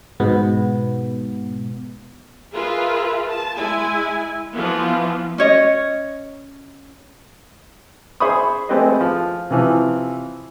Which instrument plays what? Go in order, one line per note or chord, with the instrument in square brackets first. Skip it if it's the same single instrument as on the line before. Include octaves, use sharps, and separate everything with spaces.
[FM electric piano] G#2 B2 B3
[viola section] F4 G#4 A#4 B4 E5
A5
G#3 E4 G#5
E3 F3 B3 F4
[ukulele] C#4 C#5 D#5
[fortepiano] G#4 C5 E5 B5 C#6 D#6
G#3 A3 C4 G4 B4 D#5
F3
C3 E3 F3